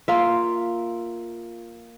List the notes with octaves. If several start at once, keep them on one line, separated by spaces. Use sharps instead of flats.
A#3 F4 E5